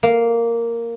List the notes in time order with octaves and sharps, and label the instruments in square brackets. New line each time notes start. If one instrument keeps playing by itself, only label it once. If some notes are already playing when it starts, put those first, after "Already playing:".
[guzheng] A#3